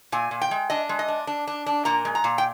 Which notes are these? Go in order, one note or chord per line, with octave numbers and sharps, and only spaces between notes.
A#2 G#5
A#2
G5
G#3
D4 D#5
G#3
D#5
D4
D4
D4
D4
A#2 A#5
G#3
A#5
A#2
G5